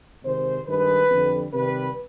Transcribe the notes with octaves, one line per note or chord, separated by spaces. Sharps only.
C3 D#3 G#3 C5
G2 D#3 G#3 B4
F2 D3 G3
C3 D#3 G3 B4